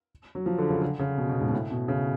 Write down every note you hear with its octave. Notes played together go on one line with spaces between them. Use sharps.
F#3
F3
D3
C#3
D3
C#3
B2
B2
G#2
B2
A2
B2
C#3